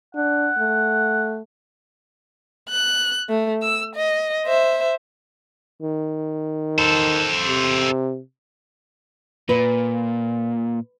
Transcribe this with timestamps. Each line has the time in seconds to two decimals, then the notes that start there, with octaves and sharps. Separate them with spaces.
0.15 D4 F#5
0.59 A3
2.70 F#6
3.29 A3
3.63 E6
3.95 D#5
4.46 C5 E5
5.82 D#3
6.78 A4 C5
7.47 C3
9.49 A#2 B4